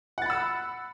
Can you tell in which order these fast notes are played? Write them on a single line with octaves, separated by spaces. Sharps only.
F#5 A6 B5 E6